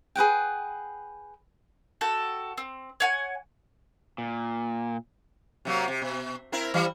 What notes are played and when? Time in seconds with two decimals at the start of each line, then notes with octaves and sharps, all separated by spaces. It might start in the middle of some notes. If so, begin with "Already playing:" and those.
0.16 G#4 B4 F#5 G5
2.01 F#4 A4 G5
2.58 C4
3.00 C#5 F#5 G#5
4.18 A#2
5.65 C3 F#3 A#3
5.88 C3
6.02 B2
6.52 C4 E4 A#4
6.74 E3 G3